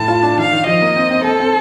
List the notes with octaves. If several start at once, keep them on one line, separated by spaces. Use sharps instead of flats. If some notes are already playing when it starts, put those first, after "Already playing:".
Already playing: A2 A5
F4
D4
D#3 F5
D#3
F3 D#5
A#3
C4
C4
C4 A4
C4